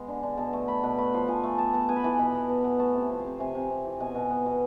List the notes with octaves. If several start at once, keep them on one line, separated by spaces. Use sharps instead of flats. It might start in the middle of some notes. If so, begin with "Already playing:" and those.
Already playing: G#3 B3
D3
D3
B2 A5
A3
A3 B5
B2
A3 B5
F3
F3 G#5
A3
B3 A5
B3 A5
B3 G#5
B5
E3 A5
B2 B5
B3
B3
B3
A3 A5
C3
F3
F5
C3
C3 G#5
C3
C3
E3
B2 G#5
B2
B3
B2